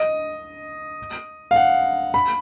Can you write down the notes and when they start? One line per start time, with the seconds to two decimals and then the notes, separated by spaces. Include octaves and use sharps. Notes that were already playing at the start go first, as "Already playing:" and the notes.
Already playing: D#5
1.51 F5
1.56 F#5
2.14 B5